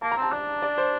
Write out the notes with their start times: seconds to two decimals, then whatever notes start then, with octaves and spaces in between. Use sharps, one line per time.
0.02 A#3 A5
0.12 A#5
0.17 C4
0.22 A5
0.32 D4 D5
0.62 D5
0.78 C5